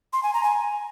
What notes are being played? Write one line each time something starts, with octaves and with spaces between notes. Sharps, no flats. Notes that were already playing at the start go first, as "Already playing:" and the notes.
C6
G#5
A#5
G#5